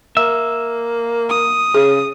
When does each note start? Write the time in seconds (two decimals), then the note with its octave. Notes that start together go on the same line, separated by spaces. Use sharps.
0.17 A#3 E5
1.30 D#6
1.74 C#3 G#4